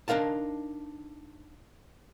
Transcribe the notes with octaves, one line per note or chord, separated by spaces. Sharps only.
D4 D#4 A#4 F5 A5